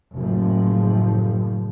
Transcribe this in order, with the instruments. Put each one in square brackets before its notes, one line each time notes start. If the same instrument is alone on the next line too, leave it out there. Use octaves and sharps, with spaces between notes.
[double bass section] F#1 A2 F3